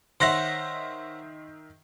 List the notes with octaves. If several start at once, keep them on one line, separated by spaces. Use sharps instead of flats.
D#3 C5 C#5 E5 F#5 C6 A#6